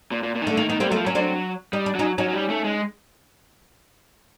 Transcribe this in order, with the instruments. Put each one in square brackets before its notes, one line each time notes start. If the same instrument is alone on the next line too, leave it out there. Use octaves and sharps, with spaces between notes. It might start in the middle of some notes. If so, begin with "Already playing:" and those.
[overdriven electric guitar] A#2
A#2
A#2
D#3
[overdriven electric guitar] D3 [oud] A3
[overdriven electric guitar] D#3 [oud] A#3
[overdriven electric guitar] D#3 [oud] B3
[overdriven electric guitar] G3 [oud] A#3 C4
[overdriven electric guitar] F#3 [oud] A3 B3
[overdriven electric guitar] F3
[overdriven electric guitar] F#3 [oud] C#4
[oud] C4 D4
[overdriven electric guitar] G3 [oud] D#4
[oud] D4
[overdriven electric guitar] F#3 [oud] C#4 D#4
[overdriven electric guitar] F#3 [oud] C#4 D#4
[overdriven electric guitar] F#3
G3
A3
G#3